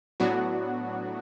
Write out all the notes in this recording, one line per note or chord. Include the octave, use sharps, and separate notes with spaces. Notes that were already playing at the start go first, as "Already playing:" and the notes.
A2 F#3 B3 D4 F#4